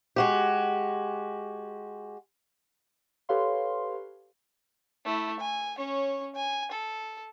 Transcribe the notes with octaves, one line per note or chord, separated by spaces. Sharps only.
G#3 F#4 G4
G4 A4 B4 C#5 F5 C6
A3 E4
G#5
C#4 C#5
G#5
A4